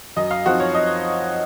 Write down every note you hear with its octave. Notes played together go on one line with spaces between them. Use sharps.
F#2 D#5
F5
F3 C4 D#4 F#4
C#5
D#5